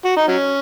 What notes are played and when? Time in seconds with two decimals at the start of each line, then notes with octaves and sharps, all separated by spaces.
0.05 F#4
0.17 D#4
0.28 F#3 C#4